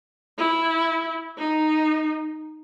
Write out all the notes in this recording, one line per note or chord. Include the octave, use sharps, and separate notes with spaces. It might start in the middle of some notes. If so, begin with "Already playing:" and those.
E4
D#4